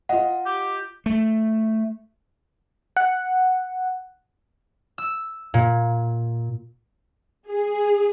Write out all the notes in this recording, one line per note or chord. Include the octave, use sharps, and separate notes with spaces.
F4 D#5 F#5
G4
A3
F#5
E6
A#2
G#4